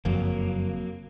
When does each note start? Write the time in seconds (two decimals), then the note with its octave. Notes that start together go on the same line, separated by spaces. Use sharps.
0.05 F#1 F2 F#3 A#3